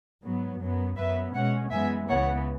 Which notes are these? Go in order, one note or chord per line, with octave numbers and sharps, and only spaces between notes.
G#2 F#3 B3
F#2 F#3 B3
F#2 F#3 B3 B4 E5
B2 G#3 C#4 C#5 F#5
F#2 E3 G#3 B3 E5 G#5
C#2 C#3 E3 B3 C#5 F#5